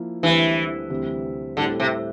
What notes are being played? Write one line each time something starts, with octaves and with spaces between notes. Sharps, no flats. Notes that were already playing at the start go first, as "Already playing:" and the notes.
Already playing: F3 A#3 E4
D2 D3 E3 G3 C4
D2 C3 E3 G3 C4
A2 D3 G3 C4 E4
C3